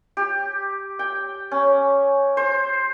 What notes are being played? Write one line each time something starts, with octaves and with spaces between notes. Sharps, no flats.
G4
G5
C#4
C5